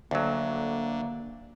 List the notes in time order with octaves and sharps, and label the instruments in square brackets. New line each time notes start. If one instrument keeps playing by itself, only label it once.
[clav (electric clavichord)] D2 F#3 [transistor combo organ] D3 [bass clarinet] A#3